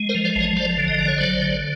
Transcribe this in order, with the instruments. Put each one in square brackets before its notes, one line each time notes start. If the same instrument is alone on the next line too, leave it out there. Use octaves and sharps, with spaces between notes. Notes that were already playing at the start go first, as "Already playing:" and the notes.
Already playing: [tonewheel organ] G#3
A#4 C5
F3
C5 D5
A1 C#5 D#5
F3 C5 D5
D3
D#5
A1 D5
C#5
F#3 C5 D5
D3